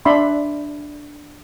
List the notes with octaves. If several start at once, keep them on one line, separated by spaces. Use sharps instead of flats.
D4 D5 E5 B5 C6